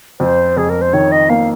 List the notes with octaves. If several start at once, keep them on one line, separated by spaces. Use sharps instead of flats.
F2 C5
F2 G#4
A#4
C5
D#3 C#5
D#5
A#3 F5